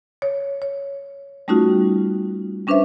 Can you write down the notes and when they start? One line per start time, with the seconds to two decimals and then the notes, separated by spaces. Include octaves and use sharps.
0.22 C#5
0.62 C#5
1.48 G3 A3 C#4 D#4 F4 F#4
2.67 G3 C#4 D4 B4 C5 E5